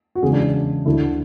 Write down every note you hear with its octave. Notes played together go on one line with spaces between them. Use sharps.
F#4
E2 C#3 G#3 G#4
D4
D4
D2 D3 A3 E4